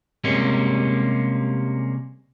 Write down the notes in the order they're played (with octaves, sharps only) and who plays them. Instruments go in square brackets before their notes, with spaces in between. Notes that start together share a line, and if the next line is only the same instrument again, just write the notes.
[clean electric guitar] C3 G3 G#3 A#3 C#4